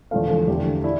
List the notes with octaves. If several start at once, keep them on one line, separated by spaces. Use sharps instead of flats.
E2 D3 F3 A3 F5
A4
E2 D3 A3 G4
D4 E4